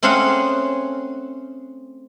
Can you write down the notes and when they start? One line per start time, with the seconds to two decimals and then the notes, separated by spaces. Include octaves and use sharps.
0.03 A3 C4 C#4 G#4 F5 F#5